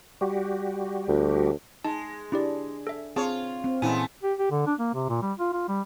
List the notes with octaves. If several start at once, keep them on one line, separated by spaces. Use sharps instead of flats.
G3 F#4 G4
D2
G#3 D#4 A5
D4 E4 G4 D5
A4 E5
C4 F4 G#4 C#5 F5 A5
C4
A#2 E3 G#3 A3 B3 C#4 E4 G#5
G4
G4
D3
D4
A#3
C3
A#2
G3
F4
F4
G3